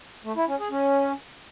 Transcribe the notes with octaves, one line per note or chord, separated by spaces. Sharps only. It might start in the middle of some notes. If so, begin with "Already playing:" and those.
A3
E4
C#4
G#4
C#4